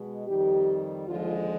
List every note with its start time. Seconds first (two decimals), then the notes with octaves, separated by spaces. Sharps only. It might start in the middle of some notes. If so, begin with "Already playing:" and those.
Already playing: B2 G#3
0.27 F2 D#3 G3 G4
1.07 D#2 D3 F3 G#3 F4